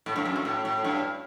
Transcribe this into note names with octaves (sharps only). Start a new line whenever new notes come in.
A2
G2
F#2
G2
A2
A2
G2